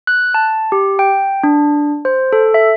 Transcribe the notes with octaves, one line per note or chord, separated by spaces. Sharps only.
F#6
A5
G4
G5
D4
C5
A4
E5